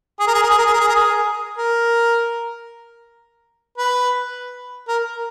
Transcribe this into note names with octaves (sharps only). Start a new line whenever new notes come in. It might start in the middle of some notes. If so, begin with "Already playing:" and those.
G#4
A#4
G#4
A#4
G#4
A#4
G#4
A#4
G#4
A#4
G#4
A#4
B4
A#4